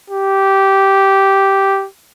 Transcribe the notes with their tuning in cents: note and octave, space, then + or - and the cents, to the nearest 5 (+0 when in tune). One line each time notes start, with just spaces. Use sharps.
G4 -10